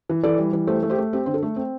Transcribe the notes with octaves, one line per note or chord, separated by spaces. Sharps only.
E3
E3 A4 D5
G3
E3
A3 G4 C5
A3
G4 C5
A3
C4 G4
D3 C5
A4
A3
C4